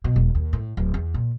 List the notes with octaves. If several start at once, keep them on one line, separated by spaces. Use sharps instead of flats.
B2
E1
D#2
A2
D1
E2
A#2